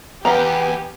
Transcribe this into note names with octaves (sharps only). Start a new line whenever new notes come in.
E2 B3 G4 F5 A#5